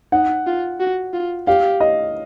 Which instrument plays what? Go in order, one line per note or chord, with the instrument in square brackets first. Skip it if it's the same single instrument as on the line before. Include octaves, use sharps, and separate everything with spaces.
[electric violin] D#4 [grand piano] F#5
[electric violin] F4
F#4
F4
[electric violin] G4 [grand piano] F5
[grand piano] D#5